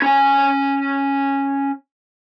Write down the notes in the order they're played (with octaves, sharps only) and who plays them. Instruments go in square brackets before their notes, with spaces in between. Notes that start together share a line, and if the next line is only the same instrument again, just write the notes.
[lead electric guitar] C#4 G#5